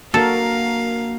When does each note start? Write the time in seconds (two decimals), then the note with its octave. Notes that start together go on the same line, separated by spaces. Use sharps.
0.14 A#3 D4 F#4 A4 A#4 F5 A5